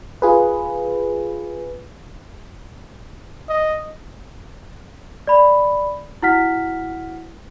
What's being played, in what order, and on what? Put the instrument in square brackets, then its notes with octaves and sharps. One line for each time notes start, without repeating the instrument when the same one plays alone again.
[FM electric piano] F4 G#4 B4
[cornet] D#5
[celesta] D5 B5
E4 F#4 F#5 F6 B6